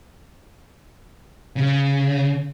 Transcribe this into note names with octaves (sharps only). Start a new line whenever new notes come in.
C#3